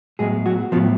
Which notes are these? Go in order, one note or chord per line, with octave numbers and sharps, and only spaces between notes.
A2 F#3 G#3 B3 G#4
F#3 F#4
A2 F3 F#3 B3 F4